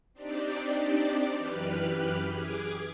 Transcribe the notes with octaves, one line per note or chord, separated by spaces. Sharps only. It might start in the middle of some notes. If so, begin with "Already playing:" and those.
C4 D4 D#4 G4 D5
F#2 E3 G4 B4 F6 F#6
G#4 G#5 D6